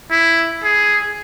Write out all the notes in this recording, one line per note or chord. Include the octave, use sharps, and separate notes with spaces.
E4
G#4